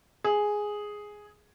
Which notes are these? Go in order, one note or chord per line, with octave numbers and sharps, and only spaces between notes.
G#4